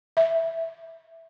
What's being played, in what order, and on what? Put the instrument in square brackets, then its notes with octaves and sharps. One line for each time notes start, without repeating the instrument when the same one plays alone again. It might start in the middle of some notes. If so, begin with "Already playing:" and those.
[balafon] E5